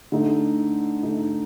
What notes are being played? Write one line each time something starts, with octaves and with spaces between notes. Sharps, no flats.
D3 A3 D#4
D3 A3 D#4